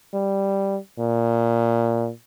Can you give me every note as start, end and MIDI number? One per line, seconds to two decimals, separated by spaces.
0.14 0.77 55
0.99 2.10 46